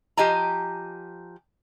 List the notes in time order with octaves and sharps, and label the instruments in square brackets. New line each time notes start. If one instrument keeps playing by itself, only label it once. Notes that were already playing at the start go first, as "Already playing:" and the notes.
[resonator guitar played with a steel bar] F3 G4 D#5 G#5 A#5